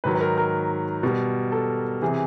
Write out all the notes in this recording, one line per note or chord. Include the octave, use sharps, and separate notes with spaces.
G#2 D#3 F#3 B4
B4
A#4
A#4
B2 G3
A4
C3 E3 G#4